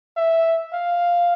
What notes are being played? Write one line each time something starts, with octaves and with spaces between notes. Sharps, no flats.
E5
F5